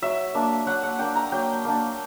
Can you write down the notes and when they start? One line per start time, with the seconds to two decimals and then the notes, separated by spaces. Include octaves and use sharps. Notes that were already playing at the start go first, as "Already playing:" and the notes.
0.02 F#3 E5
0.34 A#3 D4
0.66 F#3 F#5
0.83 F#5
0.99 A#3 D4 G5
1.15 A#5
1.32 F#3 G5
1.64 A#3 D4